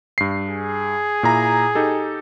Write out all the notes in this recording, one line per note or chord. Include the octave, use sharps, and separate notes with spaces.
G2 C7
G#4
A#2 E4 A#5
D#4 G4 A4